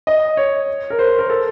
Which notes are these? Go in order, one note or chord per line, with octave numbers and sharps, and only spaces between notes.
D#5
C#5
A#4
C5
A#4
A#4
A4